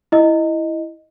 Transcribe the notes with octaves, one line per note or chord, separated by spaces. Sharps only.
E4 D#5